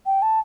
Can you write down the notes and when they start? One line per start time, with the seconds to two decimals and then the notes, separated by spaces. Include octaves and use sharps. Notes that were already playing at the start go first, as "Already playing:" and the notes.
0.06 G5
0.22 A5